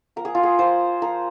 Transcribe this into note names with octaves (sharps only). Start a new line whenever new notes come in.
F3 A#4
G#4
F4
G#4
F4 C5
F3 A#4